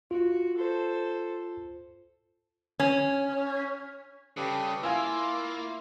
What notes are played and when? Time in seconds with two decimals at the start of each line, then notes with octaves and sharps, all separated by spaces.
0.11 F4 F#4
0.57 A4 C5
2.80 C#4
4.37 C#3 G3 G4 A4 B4
4.83 A#3 E4 F4 F5 G#5 E6